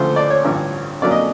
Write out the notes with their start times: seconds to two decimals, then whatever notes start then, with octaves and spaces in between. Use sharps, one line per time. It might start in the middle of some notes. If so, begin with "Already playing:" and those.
Already playing: D2 C#3 F3 A3 C5
0.16 D5
0.30 C#5
0.44 A1 G2 D3 F3
1.02 F2 D3 F#3 A#3 C#4 D5
1.11 D#5